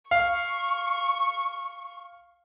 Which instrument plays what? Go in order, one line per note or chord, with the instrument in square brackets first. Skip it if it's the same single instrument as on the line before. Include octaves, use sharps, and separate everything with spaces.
[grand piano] F5 [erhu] C#6